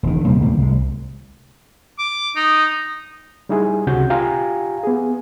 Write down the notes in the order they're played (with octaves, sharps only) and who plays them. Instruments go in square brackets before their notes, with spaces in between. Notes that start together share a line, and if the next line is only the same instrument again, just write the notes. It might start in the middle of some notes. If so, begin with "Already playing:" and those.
[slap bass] E1 D#3
D#2 C3 G3 A#3
D2 A2 C3 A#3
C2 G#3
[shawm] D6
[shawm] D#4 [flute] D#6
[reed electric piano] G3 D#4 E4 G#4
C#2 C3 C#4 F#4 G6
F4 G4 F5 G#5 A#5
B3 G#4